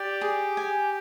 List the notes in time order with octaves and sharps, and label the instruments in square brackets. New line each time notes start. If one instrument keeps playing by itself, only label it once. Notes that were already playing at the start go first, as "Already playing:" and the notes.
Already playing: [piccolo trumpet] G4 [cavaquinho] D5
[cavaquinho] G#4
G#5